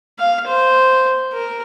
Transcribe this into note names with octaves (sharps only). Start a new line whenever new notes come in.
F5
C5
A#4